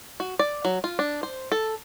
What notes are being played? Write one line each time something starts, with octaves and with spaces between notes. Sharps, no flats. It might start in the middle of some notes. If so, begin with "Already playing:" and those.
F#4
D5
F#3
F4
D4
C5
A4